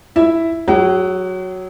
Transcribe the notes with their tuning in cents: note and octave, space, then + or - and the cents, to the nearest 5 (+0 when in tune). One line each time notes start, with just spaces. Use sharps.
E4 +0 E5 +0
F#3 +0 G#4 -30 F#5 +45